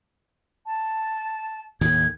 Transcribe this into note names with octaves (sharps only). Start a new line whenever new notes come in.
A5
D#2 A2 D#3 G#6